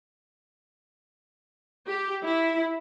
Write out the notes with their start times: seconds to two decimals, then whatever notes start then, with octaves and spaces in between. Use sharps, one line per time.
1.88 G4
2.23 E4